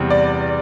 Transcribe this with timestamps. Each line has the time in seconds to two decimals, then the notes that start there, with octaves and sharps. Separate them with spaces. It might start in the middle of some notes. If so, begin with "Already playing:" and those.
Already playing: E2 C3 G3
0.10 D5